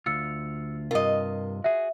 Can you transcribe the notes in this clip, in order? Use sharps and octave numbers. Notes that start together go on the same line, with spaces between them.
D2 F4 E6 C#7
G2 C3 F4 A#4 D#5
F#4 G#4 E5